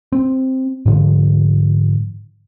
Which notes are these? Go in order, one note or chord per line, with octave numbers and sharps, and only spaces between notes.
C4
G#2 D3 F3